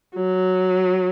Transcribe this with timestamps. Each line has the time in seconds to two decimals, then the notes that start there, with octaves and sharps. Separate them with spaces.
0.15 F#3